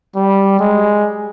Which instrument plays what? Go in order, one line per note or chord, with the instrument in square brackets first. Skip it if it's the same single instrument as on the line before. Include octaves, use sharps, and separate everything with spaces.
[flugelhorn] G3
G#3